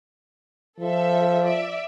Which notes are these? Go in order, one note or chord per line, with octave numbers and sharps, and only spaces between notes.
F3 A4 E5
D5 E5